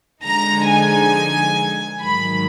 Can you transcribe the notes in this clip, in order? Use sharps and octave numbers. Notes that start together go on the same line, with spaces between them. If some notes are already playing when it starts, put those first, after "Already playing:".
D3 F3 G#3 D#4 A#5
G#5
G#2 D#3 F#3 B5